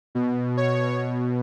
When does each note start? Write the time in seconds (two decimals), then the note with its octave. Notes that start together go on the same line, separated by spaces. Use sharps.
0.15 B2
0.57 C#5